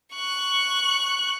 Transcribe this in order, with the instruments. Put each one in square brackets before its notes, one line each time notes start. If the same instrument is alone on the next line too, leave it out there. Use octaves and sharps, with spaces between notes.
[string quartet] C#6 F#6